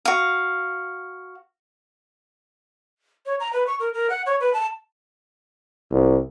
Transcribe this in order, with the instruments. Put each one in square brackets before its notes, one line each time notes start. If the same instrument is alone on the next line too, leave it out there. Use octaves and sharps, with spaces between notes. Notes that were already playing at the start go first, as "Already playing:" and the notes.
[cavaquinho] F#4 F5
[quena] C#5
A#5
B4
C#6
A#4
A#4
F#5
C#5
B4
A5
[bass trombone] C2